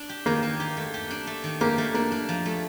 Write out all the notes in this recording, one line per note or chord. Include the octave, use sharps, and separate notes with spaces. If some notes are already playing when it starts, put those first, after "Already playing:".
Already playing: D4
G4
D#3 A#3
D#3
G4
A3
G4
D4
A3
D#3
A#3 G4
A3
A#3 D4
D4
F3
A3